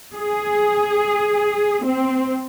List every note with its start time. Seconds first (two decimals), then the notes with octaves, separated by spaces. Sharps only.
0.14 G#4
1.85 C4